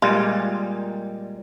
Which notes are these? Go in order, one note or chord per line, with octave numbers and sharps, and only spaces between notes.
A#2 G3 G#3 F4